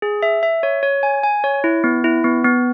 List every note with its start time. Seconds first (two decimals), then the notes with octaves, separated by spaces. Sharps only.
0.02 G#4
0.23 E5
0.43 E5
0.63 C#5
0.83 C#5
1.03 G#5
1.23 G#5
1.44 C#5
1.64 E4
1.84 B3
2.04 E4
2.24 B3
2.45 B3